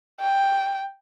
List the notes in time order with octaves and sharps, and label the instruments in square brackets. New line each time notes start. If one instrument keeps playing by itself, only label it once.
[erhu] G5